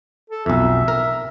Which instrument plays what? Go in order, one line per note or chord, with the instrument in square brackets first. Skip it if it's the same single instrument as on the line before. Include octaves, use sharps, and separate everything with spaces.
[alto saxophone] A4
[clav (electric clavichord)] B1 F2 [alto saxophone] E5
[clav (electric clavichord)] A#4